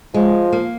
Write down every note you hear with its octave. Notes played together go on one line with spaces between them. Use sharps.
F3 G#3
A#3